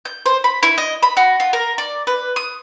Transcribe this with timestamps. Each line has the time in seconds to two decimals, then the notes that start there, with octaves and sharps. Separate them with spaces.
0.05 G6
0.26 C5
0.44 B5
0.63 E4
0.78 D#5
1.03 B5
1.17 F#4
1.40 F4
1.53 A#4
1.78 D5
2.07 B4
2.36 D#6